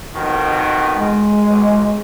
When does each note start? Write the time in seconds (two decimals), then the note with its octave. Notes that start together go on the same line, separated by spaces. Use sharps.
0.15 F2 B2 D#3
0.96 G#3
1.49 B1